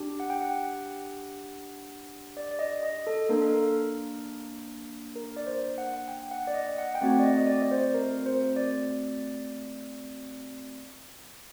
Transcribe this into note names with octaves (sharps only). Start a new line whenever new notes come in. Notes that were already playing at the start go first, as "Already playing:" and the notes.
Already playing: D4 G4
F#5
G5
F#5
D5
D5
D#5
D#5
A4
A#3 D4 A4 A#4
A4
A#4
A#4
D5
C5
F#5
G5
F#5
D5
D#5
F#5
G5
A3 C4 F#4 F#5
D5
D#5
D#5
D5
D5
C5
A#4
C5
D5